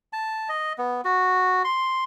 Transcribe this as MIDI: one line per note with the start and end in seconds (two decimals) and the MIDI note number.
0.13 0.49 81
0.49 0.73 75
0.78 1.01 59
1.05 1.63 66
1.64 2.04 84